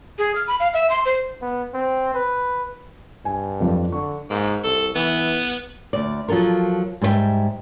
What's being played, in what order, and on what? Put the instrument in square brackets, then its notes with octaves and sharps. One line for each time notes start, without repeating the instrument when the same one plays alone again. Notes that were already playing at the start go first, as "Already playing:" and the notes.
[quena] G#4
F6
B5
F5
E5
C6
C5
[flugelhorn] B3
C4
B4
[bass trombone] G2 [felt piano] G#5
[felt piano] F2 F3 D5
[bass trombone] D3 [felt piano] C#6
[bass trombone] G#2 [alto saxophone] A#3
[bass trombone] C2 [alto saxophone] A4
[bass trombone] E3 [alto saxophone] B3
[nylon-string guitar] D2 D5
F3 F#3 F4 A4 A#4
G#2 G3 C5 E5 G5